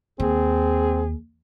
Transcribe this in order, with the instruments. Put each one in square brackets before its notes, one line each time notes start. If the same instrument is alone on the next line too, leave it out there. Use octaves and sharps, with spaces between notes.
[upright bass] D#2 [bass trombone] C4 [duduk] G#4